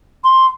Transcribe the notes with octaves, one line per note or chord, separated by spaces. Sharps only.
C6